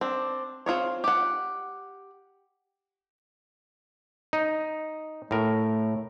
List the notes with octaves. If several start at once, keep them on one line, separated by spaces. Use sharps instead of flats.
C4 D4
C4 F4 G#4 C#5
G4 F#5
D#4
A2 A3 A#4